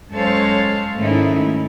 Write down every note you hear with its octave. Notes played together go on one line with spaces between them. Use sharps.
F#2 G#3 A4 C5 C#5 F5
G#2 D#3 A3 C#4 D#4 E4